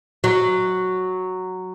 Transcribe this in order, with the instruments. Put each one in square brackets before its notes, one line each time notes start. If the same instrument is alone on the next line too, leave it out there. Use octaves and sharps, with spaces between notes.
[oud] F#3